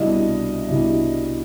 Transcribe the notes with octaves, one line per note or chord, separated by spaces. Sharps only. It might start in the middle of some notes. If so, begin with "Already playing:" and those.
Already playing: C2 B2 G3 D4 D#5
C2 B2 G3 D4